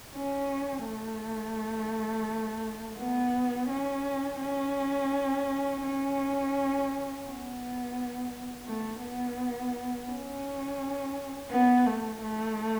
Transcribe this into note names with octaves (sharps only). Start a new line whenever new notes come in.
C#4
A3
B3
C#4
C#4
C#4
B3
A3
B3
C#4
B3
A3
A3